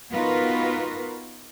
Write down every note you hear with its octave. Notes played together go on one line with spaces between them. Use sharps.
B3 D#4 F4 F#4 A#4 B4